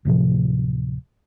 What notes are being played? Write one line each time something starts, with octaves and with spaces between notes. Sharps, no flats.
D1 A2 C3 F3